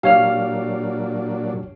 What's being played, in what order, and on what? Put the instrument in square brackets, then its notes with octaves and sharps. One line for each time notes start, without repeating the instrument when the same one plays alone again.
[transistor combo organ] A#2 F#3 D4 [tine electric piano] G4 C#5 F6 [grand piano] F5